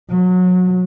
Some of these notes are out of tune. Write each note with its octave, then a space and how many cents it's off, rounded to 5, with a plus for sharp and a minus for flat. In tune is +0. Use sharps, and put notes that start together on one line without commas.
F#3 -25